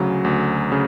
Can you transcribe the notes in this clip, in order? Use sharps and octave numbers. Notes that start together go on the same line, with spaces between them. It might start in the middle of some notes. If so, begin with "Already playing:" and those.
Already playing: D2 C#3 F#3
D2
C#3